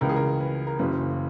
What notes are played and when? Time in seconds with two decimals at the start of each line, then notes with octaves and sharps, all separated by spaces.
0.01 C#2 C#3 E3 A#4
0.09 G#4
0.16 A#4
0.41 B4
0.67 A#4
0.79 F#1 F#2 C#3 E3 B4